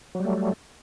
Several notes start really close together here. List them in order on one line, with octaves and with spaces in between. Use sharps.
F#3 G3 A3